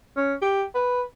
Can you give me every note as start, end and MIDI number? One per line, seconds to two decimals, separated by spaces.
0.17 0.34 61
0.42 0.64 67
0.75 1.03 71